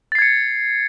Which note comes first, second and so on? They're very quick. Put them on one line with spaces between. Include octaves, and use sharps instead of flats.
A6 C7 G#6 C#7